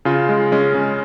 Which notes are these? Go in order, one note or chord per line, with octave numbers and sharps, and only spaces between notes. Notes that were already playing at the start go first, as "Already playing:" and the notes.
C#3 F4
G#3
G#3 C#4
C#3